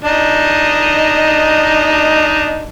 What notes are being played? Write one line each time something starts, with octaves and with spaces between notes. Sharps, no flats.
D4 D#4 D#5